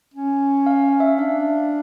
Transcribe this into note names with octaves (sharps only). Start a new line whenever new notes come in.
C#4
F5
F5
E5
D4 F5